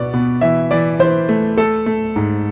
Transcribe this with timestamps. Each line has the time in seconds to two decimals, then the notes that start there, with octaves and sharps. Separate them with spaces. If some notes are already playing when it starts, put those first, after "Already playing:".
Already playing: B2 B3 D5
0.14 B2
0.41 E3 E5
0.71 E3 D5
0.99 E3 C5
1.29 A3
1.57 A3 A4
1.86 A3
2.16 G#2